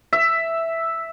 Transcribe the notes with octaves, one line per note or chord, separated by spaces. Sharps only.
E5